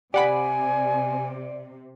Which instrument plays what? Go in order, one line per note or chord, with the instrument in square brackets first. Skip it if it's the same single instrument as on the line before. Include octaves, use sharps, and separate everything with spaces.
[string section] C3 [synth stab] G4 F#5 B5 [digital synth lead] D5 [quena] G#5